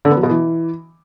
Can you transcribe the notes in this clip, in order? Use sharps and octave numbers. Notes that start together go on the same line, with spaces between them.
D3
B3
F#3
B2
E3